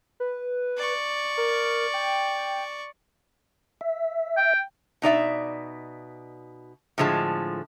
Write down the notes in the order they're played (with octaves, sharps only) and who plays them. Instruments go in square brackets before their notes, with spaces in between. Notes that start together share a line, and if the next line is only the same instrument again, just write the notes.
[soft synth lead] B4
[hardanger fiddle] D5 C#6
[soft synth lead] A#4
G5
[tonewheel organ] E5
[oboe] G5
[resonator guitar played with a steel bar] B2 D#4 D5 E5
A2 D3 F3 G#3 A5